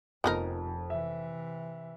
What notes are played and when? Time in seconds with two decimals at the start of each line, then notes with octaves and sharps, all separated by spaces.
0.24 F1 F2 B3 D#4 A#4
0.90 C3 E3 E5